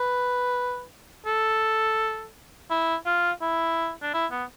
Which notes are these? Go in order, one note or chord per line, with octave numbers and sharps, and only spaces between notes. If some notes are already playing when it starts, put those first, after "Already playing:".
Already playing: B4
A4
E4
F4
E4
D4
E4
B3